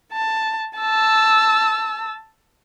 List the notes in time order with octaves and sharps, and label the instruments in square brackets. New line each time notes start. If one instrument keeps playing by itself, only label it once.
[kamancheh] A5
A5 E6